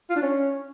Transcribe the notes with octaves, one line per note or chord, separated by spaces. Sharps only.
F4
D4
C#4